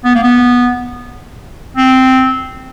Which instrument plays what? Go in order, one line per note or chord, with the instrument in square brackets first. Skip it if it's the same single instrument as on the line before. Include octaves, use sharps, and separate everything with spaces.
[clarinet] B3
A#3
B3
C4